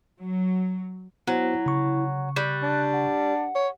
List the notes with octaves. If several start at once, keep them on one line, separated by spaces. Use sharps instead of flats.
F#3
F#3 B3 E4 F#4 C5
C#3 C#6
G3 F#6
D4
F#5
C#5